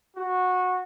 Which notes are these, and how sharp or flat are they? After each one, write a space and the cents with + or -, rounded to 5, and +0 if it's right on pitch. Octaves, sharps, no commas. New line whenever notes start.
F#4 -15